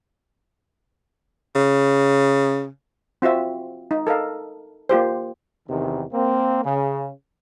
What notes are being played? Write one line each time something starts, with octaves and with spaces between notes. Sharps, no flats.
C#3
C4 F4 F#4 E5
D#4
A4 A#4 D#5 F5
A#3 F4 G4 C5
E2 C3 D#3
A#3 C4
C#3